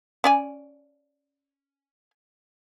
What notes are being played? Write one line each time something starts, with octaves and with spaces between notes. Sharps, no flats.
C#4 D5 G#5